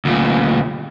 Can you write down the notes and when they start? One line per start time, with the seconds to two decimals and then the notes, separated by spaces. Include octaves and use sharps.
0.05 D2 A#2